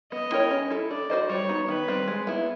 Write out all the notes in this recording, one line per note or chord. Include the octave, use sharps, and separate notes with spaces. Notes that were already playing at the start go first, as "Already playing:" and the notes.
B3 D#5
E4 G4 A#4 C#5
C#4
E4 A4
D4 D5
F#4 A4 C5 D#5
G3 C#5
B3 D#4
D#3 B4
G3 C4
G#3
B3 E4